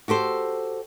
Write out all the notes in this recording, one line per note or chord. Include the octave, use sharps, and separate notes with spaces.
F#4 G4 A4 C5